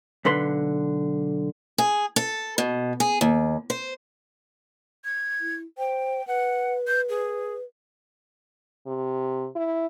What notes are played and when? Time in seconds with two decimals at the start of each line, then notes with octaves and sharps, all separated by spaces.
0.25 B1 D3 B4 C6
1.78 G#4
2.16 A4
2.58 B2
3.00 G#4
3.21 D#2
3.70 C5
5.05 G#6
5.40 E4
5.78 C5 G5
6.27 B4 F#5
6.87 G6
7.09 G#4
8.87 C3
9.55 E4